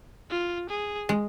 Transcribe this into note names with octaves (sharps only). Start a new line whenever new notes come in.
F4
G#4
G#3